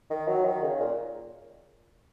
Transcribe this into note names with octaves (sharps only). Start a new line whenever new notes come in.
D#3
F#3
D#3
C#3
A#2